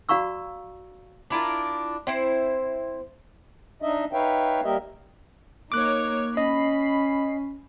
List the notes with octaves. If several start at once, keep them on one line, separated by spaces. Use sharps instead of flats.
F#4 D5 F5 A#5 C#6 E6
D4 E4 F4 A#4
C4 E4 C5
D4 D#4 D#5 E5
D#4 B4 C#5 E5 F5 G5
G3 A#3 G4 A#4 D#5 E5
A#3 D#4 C#5 D6 F#6
C#4 D#5 B5 C7